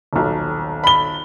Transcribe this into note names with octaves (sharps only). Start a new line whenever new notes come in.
D#1 B1
B5 G7